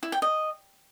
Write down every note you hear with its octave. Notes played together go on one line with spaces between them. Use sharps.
E4
G5
D#5